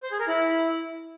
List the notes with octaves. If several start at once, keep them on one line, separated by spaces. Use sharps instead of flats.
C5
G#4
A#4
E4